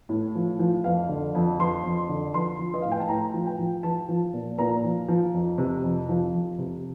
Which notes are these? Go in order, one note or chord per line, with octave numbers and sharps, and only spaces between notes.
A2
F3
F3
F2 F5
D3
F2
F3 C6
F2
D3
F3 C6
F3
D#5
A2 F5
G5
A5
A2 A#5
F3
G5
F3
F3 A5
F3
A#2
A#2 A#5
F3
F3
F2
C3
F2
F3
F2
C3